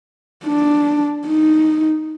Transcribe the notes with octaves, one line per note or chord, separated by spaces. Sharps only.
D4
D#4